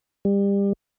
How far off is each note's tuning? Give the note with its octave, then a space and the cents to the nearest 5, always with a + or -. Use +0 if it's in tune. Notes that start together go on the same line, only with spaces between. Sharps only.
G3 +30